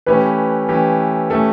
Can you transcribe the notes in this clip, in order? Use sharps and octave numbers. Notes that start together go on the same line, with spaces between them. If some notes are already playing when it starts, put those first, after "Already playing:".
E3 A3 C#4 G4 B4
E3 A3 C#4 G4
E3 A3 C#4 G4 A4